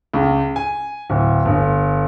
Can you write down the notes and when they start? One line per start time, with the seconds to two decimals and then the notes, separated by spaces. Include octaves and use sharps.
0.14 C#2
0.56 G#5
1.10 D1
1.45 G1